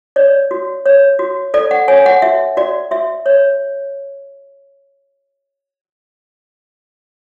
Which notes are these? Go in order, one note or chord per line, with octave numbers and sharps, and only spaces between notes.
C#5 D5
F#4
C#5
F#4
A4 D5
F#5
C#5 G#5
F#5
F#4 E5
F#4 D5
F#4 E5
C#5